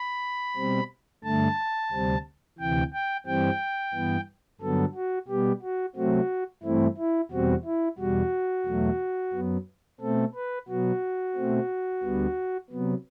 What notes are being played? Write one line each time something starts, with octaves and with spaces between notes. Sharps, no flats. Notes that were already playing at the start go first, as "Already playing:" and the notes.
Already playing: B5
B2 G3 C4
G2 D3 A3 A5
D2 C3 G3 C4
D2 C3 E3 G5
G5
G2 E3 G3 C4 G5
G2 E3 B3
G2 D3 F#3 B3 A4
F#4
B2 G3 B3 G4
F#4
C3 F#3 A3 C4 F#4
G2 E3 A3 C4 E4
E4
E2 B2 G3 C4 F#4
E4
E2 B2 G3 F#4
E2 B2 F#3 A3
F#2 F#3 B3
B2 A3 C4 A4
B4
B2 F#3 B3 F#4
B2 A3 C4
D2 D3 G3 B3
C3 F#3 B3